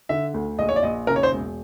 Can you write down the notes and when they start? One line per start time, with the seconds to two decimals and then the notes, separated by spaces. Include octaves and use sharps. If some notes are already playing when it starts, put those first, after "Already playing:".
0.09 D3 E5
0.34 D2
0.58 A#1 D#5
0.69 C#5
0.76 D5
0.83 A#1 D#5
1.07 C#3 A#4
1.16 C#5
1.23 C5
1.32 E1